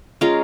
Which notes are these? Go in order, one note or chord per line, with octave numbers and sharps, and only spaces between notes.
G#3 C#4 F4 A#4